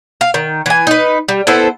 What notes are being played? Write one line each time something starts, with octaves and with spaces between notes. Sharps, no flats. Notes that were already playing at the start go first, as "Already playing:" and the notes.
F5
D#3
E3 G#5
D#4 B4
G3
B3 E4 A4 C5